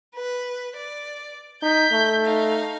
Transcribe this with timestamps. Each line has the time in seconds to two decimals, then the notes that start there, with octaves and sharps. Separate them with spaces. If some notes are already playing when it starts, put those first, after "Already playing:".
0.15 B4
0.77 D5
1.62 D#4 G6 B6
1.92 A3
2.24 D#4 F5